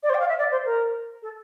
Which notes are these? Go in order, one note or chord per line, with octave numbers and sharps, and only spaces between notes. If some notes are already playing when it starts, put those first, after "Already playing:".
D5
C5
G5
F5
E5
D5
C5
A#4
A4